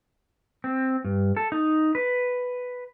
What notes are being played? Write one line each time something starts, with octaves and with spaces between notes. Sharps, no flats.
C4
G2
A4
D#4
B4